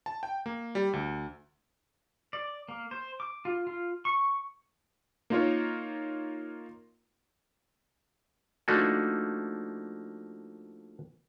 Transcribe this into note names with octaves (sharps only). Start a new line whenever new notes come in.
A5
G5
A#3
G3
D2
D5
A#3
C5
D6
F4
F4
C#6
A#3 D#4 F4 A#4 C#5
F3 A3 A#3 D4 D#4 F#4